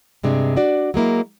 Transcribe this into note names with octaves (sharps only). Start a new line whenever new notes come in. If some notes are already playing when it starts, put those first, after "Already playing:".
G2 C3 G#3 D4
D4 F#4 D5
F#3 G#3 A#3 E4